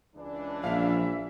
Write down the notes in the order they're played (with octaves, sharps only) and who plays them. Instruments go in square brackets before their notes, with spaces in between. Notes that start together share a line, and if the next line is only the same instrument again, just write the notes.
[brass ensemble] C#2 E3 D4
[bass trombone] A#1 [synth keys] F3 F5 [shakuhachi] E5